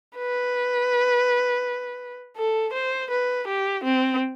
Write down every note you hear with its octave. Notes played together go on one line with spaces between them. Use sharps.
B4
A4
C5
B4
G4
C4